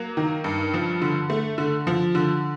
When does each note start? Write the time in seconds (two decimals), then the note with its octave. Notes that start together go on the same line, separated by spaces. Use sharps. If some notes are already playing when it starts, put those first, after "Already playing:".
Already playing: F#3 A#3
0.17 D#3
0.44 G2
0.74 F3
1.02 D3
1.30 A3
1.58 D3
1.87 F3
2.15 D3